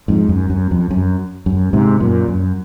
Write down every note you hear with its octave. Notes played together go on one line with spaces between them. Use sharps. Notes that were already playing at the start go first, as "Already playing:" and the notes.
F2 G#2
F#2
F#2
F2
F#2
F#2
G#2 C3
F#2 A#2
F#2